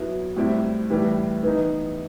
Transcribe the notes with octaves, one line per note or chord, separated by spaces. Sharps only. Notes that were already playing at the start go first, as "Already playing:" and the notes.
Already playing: F#3 B3 E4
A2 G3 C4 E4
A2 E3 G3
E3 B3 D#4